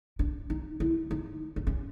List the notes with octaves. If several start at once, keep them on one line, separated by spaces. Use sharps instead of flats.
D4
D#4
E4
D#4
D4
C#4